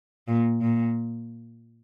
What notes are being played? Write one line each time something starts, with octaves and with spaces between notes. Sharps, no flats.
A#2
A#2